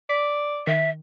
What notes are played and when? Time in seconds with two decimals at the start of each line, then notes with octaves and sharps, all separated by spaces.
0.09 D5 B6
0.67 D#3 E5